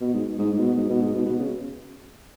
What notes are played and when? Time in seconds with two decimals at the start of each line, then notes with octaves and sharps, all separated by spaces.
0.01 B2
0.14 G#2
0.39 G#2
0.53 G#2
0.58 B2
0.77 G#2
0.89 B2
1.02 G#2
1.14 B2
1.26 B2
1.39 C#3